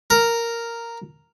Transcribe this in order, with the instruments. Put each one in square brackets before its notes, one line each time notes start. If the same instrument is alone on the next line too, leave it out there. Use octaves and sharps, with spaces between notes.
[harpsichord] A#4